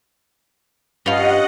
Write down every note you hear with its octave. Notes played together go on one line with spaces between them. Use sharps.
G2 C#4 F4 D#5 F5 F#5